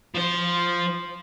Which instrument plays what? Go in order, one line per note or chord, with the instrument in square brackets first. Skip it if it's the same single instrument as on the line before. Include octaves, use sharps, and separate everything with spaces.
[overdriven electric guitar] F3 C5